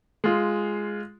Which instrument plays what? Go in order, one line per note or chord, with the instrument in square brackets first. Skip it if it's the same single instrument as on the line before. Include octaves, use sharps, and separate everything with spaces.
[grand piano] G#3 F4